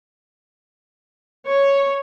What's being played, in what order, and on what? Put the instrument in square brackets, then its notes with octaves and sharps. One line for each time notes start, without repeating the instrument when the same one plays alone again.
[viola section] C#5